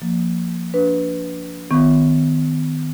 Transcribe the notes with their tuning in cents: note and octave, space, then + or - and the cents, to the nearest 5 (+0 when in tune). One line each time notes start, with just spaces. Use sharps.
F3 +0 A#3 -10
D4 -25 B4 +0
D#3 +0 B3 +30 C#6 +0